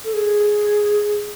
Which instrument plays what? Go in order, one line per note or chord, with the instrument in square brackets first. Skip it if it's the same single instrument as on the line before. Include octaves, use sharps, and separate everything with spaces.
[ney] A4
G#4